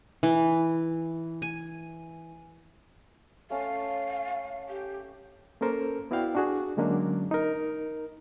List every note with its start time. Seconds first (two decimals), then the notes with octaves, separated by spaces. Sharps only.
0.23 E3
1.42 G#5
3.50 A3 C#4 F5
4.69 G4
5.61 A#3 C#4 A4 A#4 C5
6.11 B3 E4 F#4 D5 F5 G5
6.35 D4 F#4 G#4
6.77 D3 F#3 G#3 A#3 C#4 D4
7.31 D#4 A#4